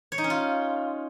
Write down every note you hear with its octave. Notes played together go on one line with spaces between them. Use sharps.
C#5
D#4
C#4
F4